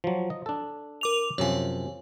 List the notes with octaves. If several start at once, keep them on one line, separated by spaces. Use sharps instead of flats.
F3 F#3
D#5
D4 A4
A#4 D6 F7
F#2 C3 F3 C#5 G#5